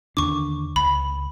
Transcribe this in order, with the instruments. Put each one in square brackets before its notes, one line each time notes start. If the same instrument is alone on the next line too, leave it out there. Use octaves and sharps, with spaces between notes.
[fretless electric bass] D#2 D3 D4 [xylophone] C#6 D6
[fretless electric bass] C#2 [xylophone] B5